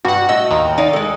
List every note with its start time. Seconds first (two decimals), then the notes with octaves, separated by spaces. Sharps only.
0.05 G2 F#4 F#5
0.29 A2 D#5 E6
0.50 D#2 D#3
0.78 D#4 D5 F5
0.93 G#3 A4